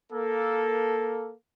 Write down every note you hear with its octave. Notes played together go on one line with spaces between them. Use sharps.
A#3 A4